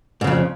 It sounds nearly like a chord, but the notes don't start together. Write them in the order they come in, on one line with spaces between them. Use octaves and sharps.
G#2 C#3 F2